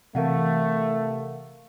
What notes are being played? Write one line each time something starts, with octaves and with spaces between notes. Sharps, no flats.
C3 E3 A3 A#4 F5 F#5